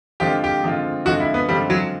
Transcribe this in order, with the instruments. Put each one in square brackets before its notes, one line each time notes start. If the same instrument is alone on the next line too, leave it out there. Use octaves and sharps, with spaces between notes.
[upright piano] D3 F3 G#3 C4 F4 [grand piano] G4
[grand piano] G4
[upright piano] D3 F3 G#3 C4 F4
[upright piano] D3 F3 G#3 C4 F4 [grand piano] F#4
[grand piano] E4
B3
[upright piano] D3 F3 G#3 C4 F4 [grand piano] G3
[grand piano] F#3